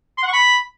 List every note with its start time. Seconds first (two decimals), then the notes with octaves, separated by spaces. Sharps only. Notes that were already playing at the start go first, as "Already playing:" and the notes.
0.18 C6
0.23 F#5
0.28 C#6
0.33 B5